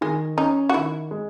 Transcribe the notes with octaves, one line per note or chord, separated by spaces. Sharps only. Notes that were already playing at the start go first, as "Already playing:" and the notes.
D#3 G#3
C#4 D#4
F#4
D#3 E4
G#3